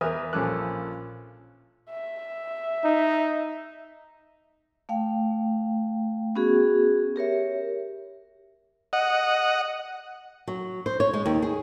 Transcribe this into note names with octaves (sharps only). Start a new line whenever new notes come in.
E2 A#4 B4 E5 D#6 F6
A#1 F3 C#4 A4 D6 F#6
E5
D#4
A3 F5 G5
B3 C#4 F#4 G#4
G4 A#4 C#5 E5
D#5 F#5
F#3
C5
C#5
G#3
D#2
G#4